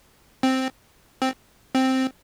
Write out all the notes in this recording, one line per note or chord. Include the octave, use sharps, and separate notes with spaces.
C4
C4
C4